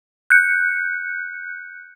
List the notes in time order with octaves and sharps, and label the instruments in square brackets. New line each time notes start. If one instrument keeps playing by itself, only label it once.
[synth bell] F#6 G6 C#7